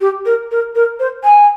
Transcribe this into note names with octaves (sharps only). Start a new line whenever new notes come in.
G4
A#4
A#4
A#4
C5
G#5